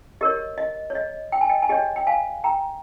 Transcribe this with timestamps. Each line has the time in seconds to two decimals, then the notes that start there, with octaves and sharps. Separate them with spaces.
0.21 G4 A#4 C#5 D#5
0.58 D#5
0.90 C#5
0.95 D#5
1.32 G5
1.41 G#5
1.49 D#5 G5
1.62 G#5
1.69 G4 C#5 D#5 G5
1.96 G5
2.07 F5 G#5
2.44 G5 A#5